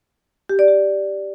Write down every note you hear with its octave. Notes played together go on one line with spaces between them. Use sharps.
G4
D5
G4